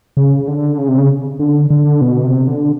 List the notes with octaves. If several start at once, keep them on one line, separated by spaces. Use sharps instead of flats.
C#3
D3
C#3
C3
C#3
D3
D3
B2
C3
D3